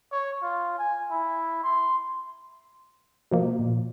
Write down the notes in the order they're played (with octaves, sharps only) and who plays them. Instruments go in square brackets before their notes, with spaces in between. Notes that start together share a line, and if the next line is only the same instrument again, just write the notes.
[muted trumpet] C#5
F4
G#5
E4
C6
[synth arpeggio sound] B2 F3 A#3
[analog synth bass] A#2